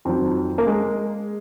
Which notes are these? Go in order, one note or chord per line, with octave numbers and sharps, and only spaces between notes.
F2 D#3 F#3 C4
A#3
G#3